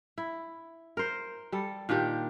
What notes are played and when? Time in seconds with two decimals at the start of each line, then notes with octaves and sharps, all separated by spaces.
0.18 E4
0.97 A#4 C5
1.52 G3 A4
1.89 A#2 D#3 D4 G4